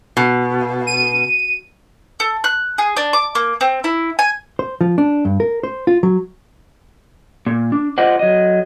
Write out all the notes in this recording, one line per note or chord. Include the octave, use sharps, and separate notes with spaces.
B2
D#7
A4
F#6
G#4
D4
D6
A#3
C4
E4
G#5
C5
F3
D4
G2
A#4
C5
F4
F#3
A#2
D4
F4 C5 D5 D#5 F#5
F#3 D#5